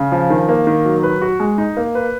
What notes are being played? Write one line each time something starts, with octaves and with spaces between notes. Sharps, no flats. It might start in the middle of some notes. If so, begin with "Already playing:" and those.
Already playing: C#3
F3
D#3
A#3
D#3
F#3
B4
F#4
G#3
D#4
A#3
B4